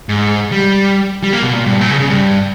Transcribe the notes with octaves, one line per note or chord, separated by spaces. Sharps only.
G#2
G3
G3
A#3
B2
A#2
G2
A#2
C#3
C#3
G2